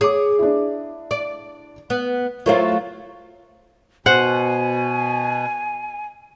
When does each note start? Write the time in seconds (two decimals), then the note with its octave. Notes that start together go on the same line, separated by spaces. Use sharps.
0.01 G#4 C#5 D6
0.39 D4 E4
1.11 D5
1.90 B3
2.46 F#3 A3 E4 F4 A#4 C5
4.06 B2 C5 F#5 G#5